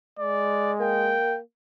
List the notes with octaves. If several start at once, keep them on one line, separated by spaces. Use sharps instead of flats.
G#3 D5
A#3 G5